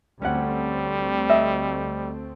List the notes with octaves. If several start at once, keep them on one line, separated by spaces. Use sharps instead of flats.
D2 G3 A3 C4 C#4 G4 F#5
D#5 E5